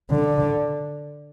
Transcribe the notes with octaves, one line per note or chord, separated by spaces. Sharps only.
D3